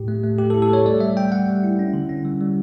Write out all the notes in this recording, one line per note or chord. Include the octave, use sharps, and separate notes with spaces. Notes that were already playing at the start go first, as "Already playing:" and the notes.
Already playing: A2 G4
A3
A3
A3 G4
A4
E4
A4
A3 C#5
G3 D5
G3 E5
G3 G5
G3 F#5
G3
E4
C#4
D3
C#4
G3
G3